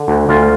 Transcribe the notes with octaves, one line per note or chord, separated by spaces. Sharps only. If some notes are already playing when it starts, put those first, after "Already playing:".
Already playing: D3
D2
D2 F4